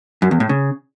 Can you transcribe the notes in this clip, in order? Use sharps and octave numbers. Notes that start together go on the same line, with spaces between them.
F#2
E2
A2
C#3